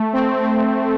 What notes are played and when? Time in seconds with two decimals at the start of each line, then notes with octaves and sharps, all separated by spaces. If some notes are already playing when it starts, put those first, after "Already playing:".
Already playing: A3
0.13 C4
0.40 C4